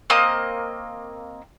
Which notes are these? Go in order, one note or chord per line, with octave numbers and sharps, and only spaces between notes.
A#3 C4 D#5 D#6